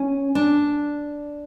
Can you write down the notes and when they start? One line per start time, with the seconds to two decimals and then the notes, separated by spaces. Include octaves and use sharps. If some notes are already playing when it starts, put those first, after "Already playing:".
Already playing: C#4
0.35 D4